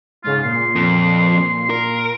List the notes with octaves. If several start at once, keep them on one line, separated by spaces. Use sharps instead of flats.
G#2 C#3 F4
A#2 C6
F2
A#4